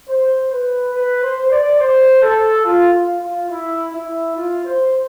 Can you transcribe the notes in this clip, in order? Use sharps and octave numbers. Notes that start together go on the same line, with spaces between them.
C5
B4
B4
C5
D5
C5
A4
F4
F4
F4
E4
E4
F4
C5